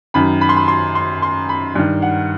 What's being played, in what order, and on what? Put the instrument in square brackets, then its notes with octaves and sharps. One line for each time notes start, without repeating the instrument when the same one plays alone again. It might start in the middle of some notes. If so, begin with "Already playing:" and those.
[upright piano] F#2 D#3 B5
B5
C6
B5
C6
C6
C6
B5
G2 D#3
F#5